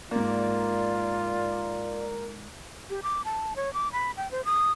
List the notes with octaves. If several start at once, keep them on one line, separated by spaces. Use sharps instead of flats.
G#2 A#3 F4 A#4 D5
G4
D6
A5
C#5
D6
B5
G5
C5
D#6